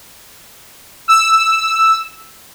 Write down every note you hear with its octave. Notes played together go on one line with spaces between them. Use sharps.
E6